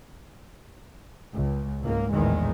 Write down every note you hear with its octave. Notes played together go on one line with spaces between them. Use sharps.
C#2
C#2 G#2 A#3
A#1 E2 A2 D#3 G#3